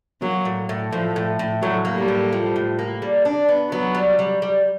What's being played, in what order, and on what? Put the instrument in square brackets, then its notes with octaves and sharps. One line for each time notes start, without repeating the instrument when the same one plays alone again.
[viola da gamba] F#3 [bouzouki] A#3
[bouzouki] A2
A2
[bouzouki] A2 [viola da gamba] F3
[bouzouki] A2
A2
[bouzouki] A2 [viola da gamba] F#3
[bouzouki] A#3
[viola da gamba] G3
[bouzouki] A2
F3
A2
A#3
G3
D4
B3
[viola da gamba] F#3 [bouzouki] B3
[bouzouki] G3
G3
G3